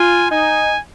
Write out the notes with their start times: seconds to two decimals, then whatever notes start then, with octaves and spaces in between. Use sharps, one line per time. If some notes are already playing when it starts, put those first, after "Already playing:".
Already playing: F4 G#5
0.31 D#4 G#5